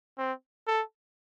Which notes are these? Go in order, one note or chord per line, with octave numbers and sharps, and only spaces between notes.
C4
A4